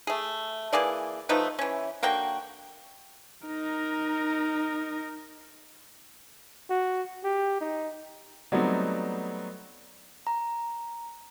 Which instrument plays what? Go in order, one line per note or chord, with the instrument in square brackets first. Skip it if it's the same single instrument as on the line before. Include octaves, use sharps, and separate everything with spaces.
[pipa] A3 G#4
E3 A#3 G#4 D5
F3 A3 D#4 B4
E3 C#4
D3 A#3 F#4 G5
[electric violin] D#4 A#4
[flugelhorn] F#4
G4
D#4
[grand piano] F#3 G3 A3 B3 C4 D#4
[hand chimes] A#5